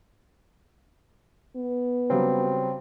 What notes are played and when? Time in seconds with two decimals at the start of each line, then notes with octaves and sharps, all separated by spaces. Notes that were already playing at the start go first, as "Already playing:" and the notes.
1.56 B3
2.10 C#3 F#3 G3 C4